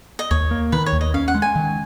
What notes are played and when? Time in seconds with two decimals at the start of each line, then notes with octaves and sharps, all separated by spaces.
0.19 D#5
0.31 D#2 C#5
0.51 A#3
0.72 D#3 B4
0.86 C#5
0.93 D#2
1.01 D#5
1.14 C#4 F5
1.28 F#5
1.35 G#3
1.42 G#5
1.56 D#3